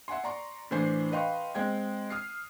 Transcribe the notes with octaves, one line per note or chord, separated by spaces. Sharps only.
E5 F#5 G#5 C6
D5 A#5 C6 C#6
A2 E3 D4 C5 G#5 C7
B4 D#5 F5 G5 C6 C#6
G#3 C4 G5 G#6
D#6 F6 C7